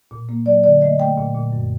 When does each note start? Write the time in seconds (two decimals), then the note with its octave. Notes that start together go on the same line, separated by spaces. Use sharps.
0.11 A#2
0.29 A#3
0.46 F#3 D5
0.64 D3 D5
0.81 A3 D#5
1.00 A3 G5
1.18 A#2
1.35 A#2
1.52 F#2